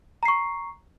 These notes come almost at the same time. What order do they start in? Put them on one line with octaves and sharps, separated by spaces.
A#5 C7 C#6